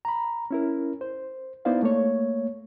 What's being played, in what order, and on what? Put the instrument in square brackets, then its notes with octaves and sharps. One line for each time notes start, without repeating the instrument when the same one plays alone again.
[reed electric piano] A#5 B5
C#4 E4 A#4
C5
B3 D#4 E4 C5 D5 F5
A3 A#3 C#5